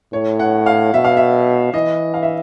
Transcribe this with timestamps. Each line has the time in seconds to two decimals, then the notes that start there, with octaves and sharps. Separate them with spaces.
0.12 A2 C#5
0.39 F#5
0.66 F5
0.94 B2 E5
1.04 F5
1.17 E5
1.73 E3 D#5
2.14 F5
2.23 E5